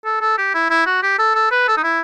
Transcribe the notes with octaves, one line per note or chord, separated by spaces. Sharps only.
A4
A4
G4
E4
E4
F#4
G4
A4
A4
B4
A4
D#4
E4